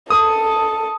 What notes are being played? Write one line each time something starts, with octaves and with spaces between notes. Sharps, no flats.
A4 D#6